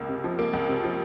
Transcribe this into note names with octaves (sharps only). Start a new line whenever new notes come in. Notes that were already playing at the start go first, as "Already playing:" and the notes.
Already playing: C#2 A#3
C3
F3
A#3
C#2
C3
F3